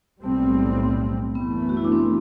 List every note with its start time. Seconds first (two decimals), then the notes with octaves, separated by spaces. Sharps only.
0.23 B1 A2 G3 A3 C4
0.31 B3
0.39 A3
1.35 F#1 F#2 E3 A3 B3
1.69 F#4
1.77 E4
1.84 D4
1.92 C4